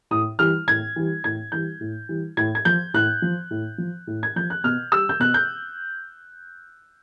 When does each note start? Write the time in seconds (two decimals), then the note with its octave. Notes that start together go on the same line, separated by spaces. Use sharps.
0.11 A2 D#6
0.39 E3 G3 F6
0.68 A2 G#6
0.96 E3 G3
1.24 A2 G#6
1.52 E3 G3 G6
1.81 A2
2.09 E3 G3
2.37 A2 G#6
2.55 G#6
2.65 F3 G6
2.94 A2 F#6
3.22 F3
3.51 A2
3.78 F3
4.07 A2
4.23 G#6
4.36 F3 G6
4.50 F#6
4.64 B2 F6
4.92 G3 E6
5.09 G6
5.20 B2 F#6
5.34 G6